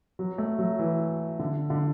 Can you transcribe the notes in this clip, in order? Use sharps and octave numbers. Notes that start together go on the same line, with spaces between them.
F#3
A3
F#3
E3
D3
D3